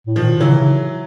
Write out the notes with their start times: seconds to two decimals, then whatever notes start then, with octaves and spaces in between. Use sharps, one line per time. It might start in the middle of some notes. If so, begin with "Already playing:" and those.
0.07 A2
0.16 A#2 D#3 F3
0.28 B2
0.40 C#3 E3 F#3
0.53 C#3